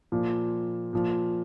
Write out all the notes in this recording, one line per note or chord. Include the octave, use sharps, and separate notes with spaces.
A#2 F3
A#2 F3